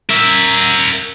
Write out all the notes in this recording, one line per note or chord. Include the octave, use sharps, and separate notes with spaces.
A#4 E5